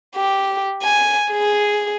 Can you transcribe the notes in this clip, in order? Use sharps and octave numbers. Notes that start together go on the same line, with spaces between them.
G4
G#5
G#4